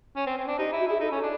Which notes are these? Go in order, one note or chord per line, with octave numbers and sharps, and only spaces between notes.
C#4
C4
C4
D4
D#4 G4
E4
F#4
E4 G#4
D#4 A4
C#4
D4